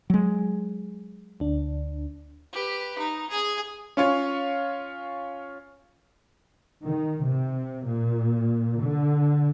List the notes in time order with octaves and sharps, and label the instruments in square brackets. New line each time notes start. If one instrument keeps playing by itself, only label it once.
[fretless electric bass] F#3 G#3
[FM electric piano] D2 D4
[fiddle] G4 B4
D#4
G#4 G#5
[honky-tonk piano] C#4 F4 C#5
[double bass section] D#3
C3
A#2
D3